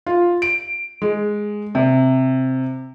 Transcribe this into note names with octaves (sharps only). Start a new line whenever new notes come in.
F4
D7
G#3
C3